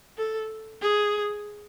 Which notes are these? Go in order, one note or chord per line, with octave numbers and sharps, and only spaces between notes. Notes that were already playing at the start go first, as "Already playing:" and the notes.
A4
G#4